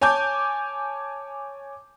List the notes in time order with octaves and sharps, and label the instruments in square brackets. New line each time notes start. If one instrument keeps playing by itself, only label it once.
[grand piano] C#5 G#5 A5 D6 G6